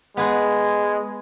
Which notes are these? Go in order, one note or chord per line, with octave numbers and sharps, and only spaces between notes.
G#3 B3 G#4 F#5